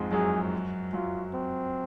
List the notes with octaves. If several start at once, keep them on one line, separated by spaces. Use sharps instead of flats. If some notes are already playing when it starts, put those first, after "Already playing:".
Already playing: F2 G#2 F3 G#3
F#2 F#3 G#4
F#2 F#3 F4
C4